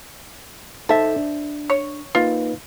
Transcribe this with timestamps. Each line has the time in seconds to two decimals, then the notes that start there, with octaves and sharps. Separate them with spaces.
0.89 D#4 A4 C5 E5 A5
1.16 D4
1.70 C#5
2.15 A#3 D#4 F4 B4